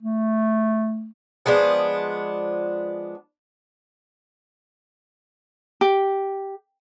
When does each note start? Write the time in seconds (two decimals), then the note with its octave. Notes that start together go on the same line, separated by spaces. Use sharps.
0.03 A3
1.46 F3 G#3 B3 D4
5.81 G4